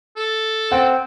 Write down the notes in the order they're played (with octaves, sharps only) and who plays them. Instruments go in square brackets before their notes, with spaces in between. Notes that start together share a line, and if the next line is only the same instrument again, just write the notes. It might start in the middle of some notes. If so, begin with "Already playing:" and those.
[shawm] A4
[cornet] C4 [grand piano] F#5